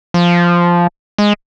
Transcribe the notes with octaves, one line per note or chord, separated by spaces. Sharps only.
F3
G#3